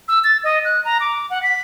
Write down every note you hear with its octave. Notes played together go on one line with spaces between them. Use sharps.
E6
A6
D#5
F#6
A#5
D6
F#5
B6